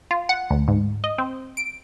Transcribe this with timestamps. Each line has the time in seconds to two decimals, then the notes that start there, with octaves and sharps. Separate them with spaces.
0.11 F4
0.29 F#5
0.50 D2
0.68 G#2
1.04 D#5
1.18 C4
1.57 D7